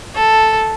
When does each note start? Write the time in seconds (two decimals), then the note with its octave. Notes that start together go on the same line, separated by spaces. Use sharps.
0.15 A4